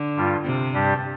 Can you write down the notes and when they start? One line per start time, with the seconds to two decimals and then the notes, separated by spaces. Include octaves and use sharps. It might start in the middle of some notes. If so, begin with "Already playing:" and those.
Already playing: D3
0.16 G2 G3 F4
0.45 C3
0.74 G2 G3 D4 G4